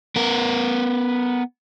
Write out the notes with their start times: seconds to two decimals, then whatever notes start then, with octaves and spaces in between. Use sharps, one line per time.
0.16 B3 A#4